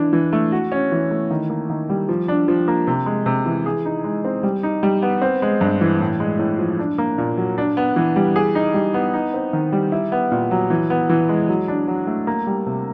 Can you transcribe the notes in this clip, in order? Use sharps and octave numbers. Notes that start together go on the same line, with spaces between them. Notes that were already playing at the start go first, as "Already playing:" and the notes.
Already playing: E3 D4
E3
A3
F#4
C#4
E3
A3
D#3
A#3
D#3
G3
F3
D4
F3
A#3
C3
G#3
C3
E3
G#4
D#4
G#3
C4
G3
D#4
G3
B3
C4
G#3
G2
E3
A2
G#3
A2
F3
D4
A#3
A#2
F#3
D4
B3
E3
G3
G#4
D#4
G3
B3
D#4
C4
D#3
G3
E4
B3
A#2
F#3
E3
B3
E3
G#3
F#3
D4
F#3
A3
A#3
G3
C3